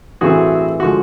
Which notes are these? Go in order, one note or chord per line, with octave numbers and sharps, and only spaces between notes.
A1 G2 E3 A3 C4 F#4 G#4
D3 F3 G#3 F#4